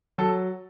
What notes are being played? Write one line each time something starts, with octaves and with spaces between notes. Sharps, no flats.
F#3 A4